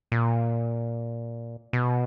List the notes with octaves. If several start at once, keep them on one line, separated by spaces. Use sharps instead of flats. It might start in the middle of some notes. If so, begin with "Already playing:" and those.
A#2
B2